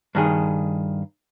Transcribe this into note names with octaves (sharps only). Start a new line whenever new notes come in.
G2 D#3 G#4